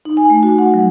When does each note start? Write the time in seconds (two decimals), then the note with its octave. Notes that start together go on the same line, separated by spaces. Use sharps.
0.05 D#4
0.17 G#5
0.30 A3
0.43 F#4
0.58 F#5
0.74 F#3